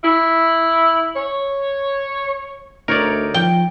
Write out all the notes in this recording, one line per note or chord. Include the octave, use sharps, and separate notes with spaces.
E4
C#5
D2 D#4 A#4 C#5 D5
F3 G5